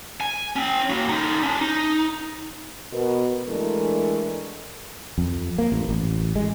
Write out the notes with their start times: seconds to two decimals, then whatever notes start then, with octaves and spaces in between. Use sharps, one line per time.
0.21 G#5
0.56 C#4 G5
0.90 A#3 F#4
1.09 D3 D#4
1.43 C#4 D4
1.61 D#4
2.93 B2 B3 A#4
3.48 E3 G#3 A3 D4 A4 A#4
5.18 F2
5.58 A#3
5.72 A1
5.89 A1
6.36 G#3